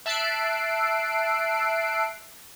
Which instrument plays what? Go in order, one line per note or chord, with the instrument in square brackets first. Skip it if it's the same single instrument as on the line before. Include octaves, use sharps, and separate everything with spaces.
[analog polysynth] E5 A5 E6 F#6 C7 D7